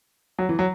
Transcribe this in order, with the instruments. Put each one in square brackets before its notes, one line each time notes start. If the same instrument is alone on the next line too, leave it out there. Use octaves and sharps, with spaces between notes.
[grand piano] F#3
E3
F#3